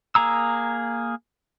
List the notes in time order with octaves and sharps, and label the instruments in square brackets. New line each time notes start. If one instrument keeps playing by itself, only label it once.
[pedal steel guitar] A#3 G#4 A#5 E6